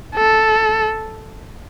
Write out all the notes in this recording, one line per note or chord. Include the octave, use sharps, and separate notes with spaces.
A4